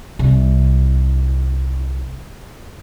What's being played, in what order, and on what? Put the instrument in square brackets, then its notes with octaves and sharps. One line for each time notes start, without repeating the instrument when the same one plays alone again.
[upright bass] C2 C3